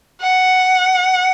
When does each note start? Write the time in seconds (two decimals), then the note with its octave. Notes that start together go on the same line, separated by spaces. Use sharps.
0.21 F#5